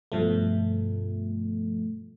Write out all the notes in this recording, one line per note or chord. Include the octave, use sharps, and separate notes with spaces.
G2 B2 F3 A3